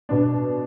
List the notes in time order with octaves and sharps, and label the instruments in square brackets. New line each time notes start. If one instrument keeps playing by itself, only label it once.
[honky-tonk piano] B2 B3 D4